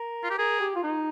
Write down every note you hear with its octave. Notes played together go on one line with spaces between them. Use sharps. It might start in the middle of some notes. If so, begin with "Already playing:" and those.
Already playing: A#4
F4
G4
G#4 A#4
G4
F4
D#4